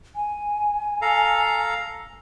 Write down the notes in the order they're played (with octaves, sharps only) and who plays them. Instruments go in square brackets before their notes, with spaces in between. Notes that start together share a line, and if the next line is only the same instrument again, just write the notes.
[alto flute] G#5
[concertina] A4 F5 A#5